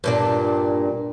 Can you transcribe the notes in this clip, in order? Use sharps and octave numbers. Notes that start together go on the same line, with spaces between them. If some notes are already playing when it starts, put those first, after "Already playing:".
G2 A#2 D4